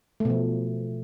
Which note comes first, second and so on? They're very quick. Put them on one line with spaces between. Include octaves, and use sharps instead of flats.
A3 B2 F3